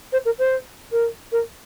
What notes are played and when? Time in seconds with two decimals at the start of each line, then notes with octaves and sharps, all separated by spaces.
0.12 C5
0.25 A#4
0.39 C5
0.92 A#4
1.32 A#4